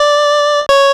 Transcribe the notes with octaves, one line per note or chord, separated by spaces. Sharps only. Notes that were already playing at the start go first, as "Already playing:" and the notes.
Already playing: D5
C#5